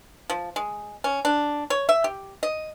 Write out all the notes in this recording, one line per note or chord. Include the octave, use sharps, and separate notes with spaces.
F3
G#3
C#4
D4
C#5
E5
G4
D#5